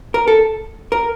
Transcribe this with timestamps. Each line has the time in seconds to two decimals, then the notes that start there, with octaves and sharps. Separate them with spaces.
0.14 A#4
0.28 A4
0.92 A#4